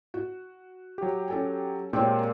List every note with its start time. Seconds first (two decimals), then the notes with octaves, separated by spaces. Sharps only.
0.14 F#4
0.98 F#3 G4
1.28 C#4 A4 G#5
1.93 A#2 G#3 A#3 C4 G4 C#5